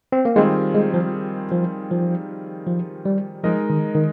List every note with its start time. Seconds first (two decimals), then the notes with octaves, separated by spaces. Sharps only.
0.12 C4
0.25 A#3
0.36 D#3 G3 G#3 C4 F4 G#4
0.75 G#3
0.94 F3
1.52 F3
1.91 F3
2.67 F3
3.05 G3
3.43 F3 G#3 D#4 A#4 D#5
3.70 D#3
3.95 D#3